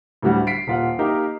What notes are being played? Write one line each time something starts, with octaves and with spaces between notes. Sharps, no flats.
D2 A2 G3 F#4
B6 C7 D7
D#1 F4 F#5
A#3 D#4 G4 A#4